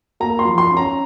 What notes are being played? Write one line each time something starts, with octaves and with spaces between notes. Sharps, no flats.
A#3 A#5
C6
F3
C6
C#4
A#5